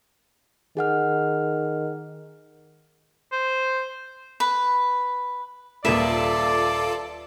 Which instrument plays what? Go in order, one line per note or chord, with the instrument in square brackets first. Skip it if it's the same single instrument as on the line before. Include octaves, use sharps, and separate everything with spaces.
[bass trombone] D#3 [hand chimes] G#4 F#5 F6
[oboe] C5
[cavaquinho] B4
[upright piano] D#1 A#3 [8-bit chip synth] F4 A4 [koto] B4 E5 [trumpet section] D5